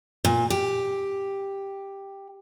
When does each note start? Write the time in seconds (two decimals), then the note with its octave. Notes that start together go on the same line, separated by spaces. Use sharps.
0.25 A#2
0.50 G4